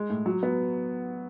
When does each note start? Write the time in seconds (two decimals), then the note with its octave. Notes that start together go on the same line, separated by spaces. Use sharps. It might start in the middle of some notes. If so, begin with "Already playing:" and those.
Already playing: G#3
0.10 A2
0.26 F#3
0.43 B3